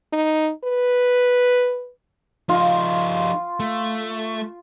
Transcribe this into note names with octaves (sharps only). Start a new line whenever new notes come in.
D#4
B4
F3 D#4 F4
A3